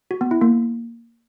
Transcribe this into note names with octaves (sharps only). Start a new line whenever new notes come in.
F#4
B3
E4
A#3